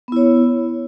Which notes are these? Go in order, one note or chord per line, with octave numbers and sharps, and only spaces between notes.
B3 E4 C#5